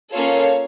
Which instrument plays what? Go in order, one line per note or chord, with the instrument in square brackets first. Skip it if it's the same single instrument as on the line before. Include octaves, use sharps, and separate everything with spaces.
[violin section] A#3 C#4 F4 A4 C#5 F5